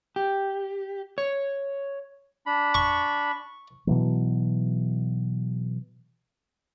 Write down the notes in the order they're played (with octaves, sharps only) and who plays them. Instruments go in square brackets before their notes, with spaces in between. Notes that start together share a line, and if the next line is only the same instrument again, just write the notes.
[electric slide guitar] G4
C#5
[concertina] D4 B5
[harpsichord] C#6
[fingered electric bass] B2 E3 F#3